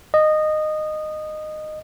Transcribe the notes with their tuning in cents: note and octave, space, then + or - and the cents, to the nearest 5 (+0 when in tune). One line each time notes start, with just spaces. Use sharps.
D#5 -15